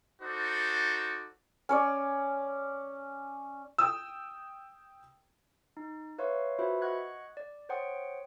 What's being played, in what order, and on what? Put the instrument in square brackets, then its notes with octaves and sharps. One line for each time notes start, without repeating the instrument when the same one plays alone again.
[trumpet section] D#4 F#4 A4 C5 D5
[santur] C#4 C#5 D5
[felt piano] G5 D#6 E6
[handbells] D#4
B4 C#5 E5 F5 C6 C#6
F4 F#4 B4 C5 E5 B5
D#5 F#5 C#6 F#6 G#6
D5
C5 C#5 F#5 G5 C6 D#6